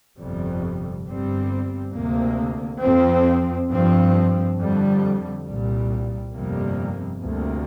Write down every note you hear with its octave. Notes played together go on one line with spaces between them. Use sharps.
G1 F2 C3 G3
G1 G2 G3 C4
D2 C3 A#3
F2 F3 C4
G2 F3 C4
F2 D3 G3
C2 A#2 G3
G1 F2 C3 G3 A#3
D2 C3 G3 A#3